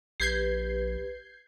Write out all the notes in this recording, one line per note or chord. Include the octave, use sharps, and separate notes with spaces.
A#1 G4 B4 G6 G#6 C7